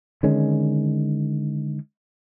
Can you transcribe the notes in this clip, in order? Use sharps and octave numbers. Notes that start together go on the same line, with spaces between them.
D3 D#3 G#3 C#4